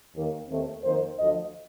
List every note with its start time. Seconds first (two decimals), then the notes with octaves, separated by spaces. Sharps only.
0.15 D#2 D#3 A#3
0.49 D#2 D#3 A3 C4
0.83 F2 D#3 A#3 C5
1.18 D2 D3 F3 D#5